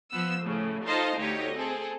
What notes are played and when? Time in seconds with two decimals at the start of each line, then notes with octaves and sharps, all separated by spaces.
0.13 F3 B3 E6
0.44 A2 C#3
0.85 D#4 F4 A4 C5 D#5 F5
1.18 D2 D#4 G4 C#5 D#5
1.54 C4 G#4 A4